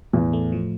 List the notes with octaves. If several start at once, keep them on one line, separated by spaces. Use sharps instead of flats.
E2 A2
A3
F3